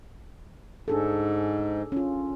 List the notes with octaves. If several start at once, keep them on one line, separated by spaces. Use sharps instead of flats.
G#2 D4 G#4 A4
C#4 F4